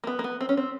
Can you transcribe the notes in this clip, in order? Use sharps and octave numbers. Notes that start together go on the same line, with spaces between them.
A#3
B3
A#3
B3
C4
C#4
C4